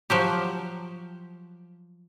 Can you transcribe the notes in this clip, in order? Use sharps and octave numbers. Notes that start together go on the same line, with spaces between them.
F3 F#3 G4